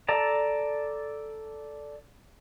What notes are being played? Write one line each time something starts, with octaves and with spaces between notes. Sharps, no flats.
A4 D5 A5 A#5